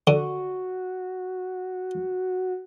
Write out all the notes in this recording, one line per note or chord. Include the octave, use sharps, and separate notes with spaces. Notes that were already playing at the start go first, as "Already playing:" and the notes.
D3 F#4